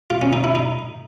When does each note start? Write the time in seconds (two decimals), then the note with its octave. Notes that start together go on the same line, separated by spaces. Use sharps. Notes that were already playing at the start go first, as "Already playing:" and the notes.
0.10 F4
0.22 C#4
0.33 D#4
0.44 E4
0.55 D#4